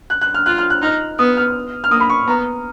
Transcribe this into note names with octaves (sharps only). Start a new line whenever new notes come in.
F#6
F#6
F6
F4 F#6
F6
F#6
D#4 F6
B3 D#6
F6
F6
A#3 D#6
B5
C#6
B3 A#5